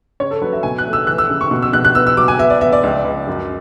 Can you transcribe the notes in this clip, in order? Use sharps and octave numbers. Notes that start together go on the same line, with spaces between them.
C#3 C#5
A4
F#3 B4
E5
B2 G#5
F#6
A3
E6
E3 F#6
E6
C#3
C#6
B2
E6
B2 F#6
F#6
B3 E6
E6
F#3 D6
G#5
B3 E5
D5
B3 E5
D5
C#2
C#2
F#2